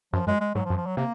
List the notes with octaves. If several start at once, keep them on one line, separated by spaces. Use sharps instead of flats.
F#2 F3
F#2 G#3
G#3
G#2 F#3
F3
F#2
F3
F#3
C3 A#3